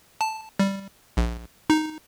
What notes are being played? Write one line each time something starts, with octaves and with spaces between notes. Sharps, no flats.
A5
G3
A#1
D#4